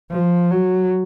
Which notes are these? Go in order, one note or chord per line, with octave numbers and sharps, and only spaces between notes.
F3
F#3